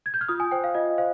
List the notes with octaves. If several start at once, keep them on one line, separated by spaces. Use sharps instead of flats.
G#6
G6
F6
F4 D#6
G#5
C5 G5
F5
F4 D#5
C5 F5